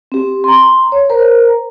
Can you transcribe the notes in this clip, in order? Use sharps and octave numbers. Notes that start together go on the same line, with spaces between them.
C4 G4
A#5 C6
C#5
A#4 C5 A#5